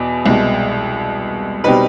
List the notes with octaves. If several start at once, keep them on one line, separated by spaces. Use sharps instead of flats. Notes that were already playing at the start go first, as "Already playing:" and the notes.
Already playing: E2 B2
C2 B2 G#3
B2 G3 C4 D#4 B4